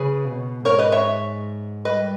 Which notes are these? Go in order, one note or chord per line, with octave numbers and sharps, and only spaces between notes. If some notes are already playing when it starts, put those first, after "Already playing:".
Already playing: C#3 G#4 B4
B2
G#2 A#4 C#5
B4 D#5
C#5 E5
G3 B4 D#5